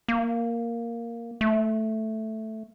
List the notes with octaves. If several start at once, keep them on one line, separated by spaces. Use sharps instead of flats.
A#3
A3